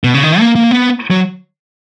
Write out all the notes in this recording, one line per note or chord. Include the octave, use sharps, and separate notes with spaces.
B2
C#3
D#3
A#3
A#3
B3
F#3